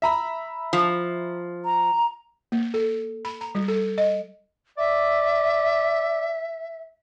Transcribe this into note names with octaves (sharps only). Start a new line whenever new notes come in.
E5 A#5 B5
F3
A#5
A#3
A4
B5
A#5
G3
A4
D#5
D5 E5